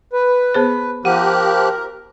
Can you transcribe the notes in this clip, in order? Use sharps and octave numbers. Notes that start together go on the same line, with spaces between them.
B4
B3 G#4 C5
F3 G4 A#4 F#5 F#6